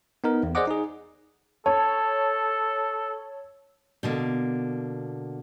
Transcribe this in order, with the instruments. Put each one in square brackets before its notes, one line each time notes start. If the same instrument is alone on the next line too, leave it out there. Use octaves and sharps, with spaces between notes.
[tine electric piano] B3 D#4 A#4
E2
G#4 C5 D5 D#5 F#5 D6
D#4 G#4
[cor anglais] A4 [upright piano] C#5 [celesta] A5
[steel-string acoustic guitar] B2 D3 A#3